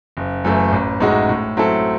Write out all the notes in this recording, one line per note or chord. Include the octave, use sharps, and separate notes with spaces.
F#1
F#2 E3 A3
A1
A2 G#3 D#4 F#4
A2
F#3 C4 E4 A4